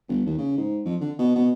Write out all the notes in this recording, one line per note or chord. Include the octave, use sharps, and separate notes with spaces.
G1
D#2
C#3
G#2
F2
D3
B2
B2